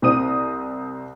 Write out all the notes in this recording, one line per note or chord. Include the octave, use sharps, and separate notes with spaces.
C2 C4 D#6 D#7